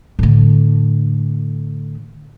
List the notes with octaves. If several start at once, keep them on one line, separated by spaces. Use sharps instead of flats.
A2 D3